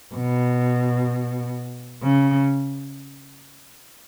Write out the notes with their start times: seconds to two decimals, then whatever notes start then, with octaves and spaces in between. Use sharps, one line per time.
0.15 B2
2.03 C#3